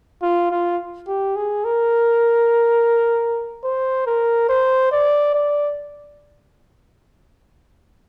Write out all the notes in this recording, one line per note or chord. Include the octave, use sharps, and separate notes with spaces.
F4
F4
G4
G#4
A#4
C5
A#4
C5
D5
D5